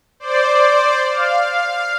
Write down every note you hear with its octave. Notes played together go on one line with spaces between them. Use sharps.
C5 D5
F5